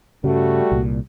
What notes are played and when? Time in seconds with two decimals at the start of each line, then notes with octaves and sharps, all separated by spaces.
0.24 G2 C#3 G3 A3 F#4
0.72 C2 A#2